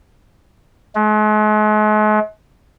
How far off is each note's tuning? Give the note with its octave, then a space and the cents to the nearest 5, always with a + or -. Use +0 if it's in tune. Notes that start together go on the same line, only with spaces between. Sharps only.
G#3 +45